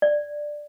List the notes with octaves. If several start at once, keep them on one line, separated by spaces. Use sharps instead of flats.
D5